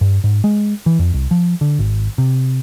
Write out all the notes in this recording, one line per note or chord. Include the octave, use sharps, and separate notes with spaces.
G2
G#2
G#3
E3
F2
C2
F3
D3
G#1
C3